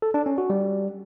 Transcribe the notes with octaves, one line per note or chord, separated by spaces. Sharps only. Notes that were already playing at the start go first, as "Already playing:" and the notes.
A4
D4
C#4
F#4
G3